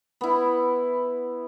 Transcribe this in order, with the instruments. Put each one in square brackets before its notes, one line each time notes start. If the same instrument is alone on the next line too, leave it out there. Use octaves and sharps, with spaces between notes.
[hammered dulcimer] B3 E4